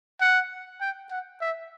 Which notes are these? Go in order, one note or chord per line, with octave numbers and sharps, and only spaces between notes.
F#5
G5
F#5
E5